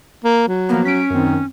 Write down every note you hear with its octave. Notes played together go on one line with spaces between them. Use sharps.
A#3
F#3
F3 A#3 B3
C#4 B6 D7
F#2 D#3 C4